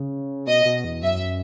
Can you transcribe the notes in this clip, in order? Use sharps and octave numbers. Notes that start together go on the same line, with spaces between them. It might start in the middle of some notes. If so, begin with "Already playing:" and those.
Already playing: C#3
B2 D#5
B2
E2
F#2 E5